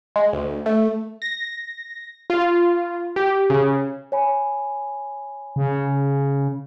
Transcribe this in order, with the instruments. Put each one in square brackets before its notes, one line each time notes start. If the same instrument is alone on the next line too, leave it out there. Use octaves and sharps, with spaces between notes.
[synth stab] G#3
D2
A3
[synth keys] A#6
F4
G4
C#3
[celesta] C#5 G#5 B5
[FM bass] C#3